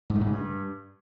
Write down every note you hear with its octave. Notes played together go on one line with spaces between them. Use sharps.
G#2
A3
G#2
C#3
G2